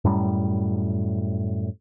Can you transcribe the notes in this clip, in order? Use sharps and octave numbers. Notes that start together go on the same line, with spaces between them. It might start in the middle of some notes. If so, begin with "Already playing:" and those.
F#2 A2 G3